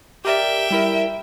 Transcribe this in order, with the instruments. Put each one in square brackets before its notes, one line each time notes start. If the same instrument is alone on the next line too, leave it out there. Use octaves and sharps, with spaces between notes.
[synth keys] G4 A#4 D5 [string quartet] E5 G5
[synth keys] G3 E4 A#4